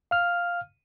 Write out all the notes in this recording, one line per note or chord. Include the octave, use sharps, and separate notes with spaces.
F5 F6